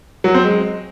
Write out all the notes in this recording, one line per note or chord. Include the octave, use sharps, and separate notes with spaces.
F#3
C4
G#3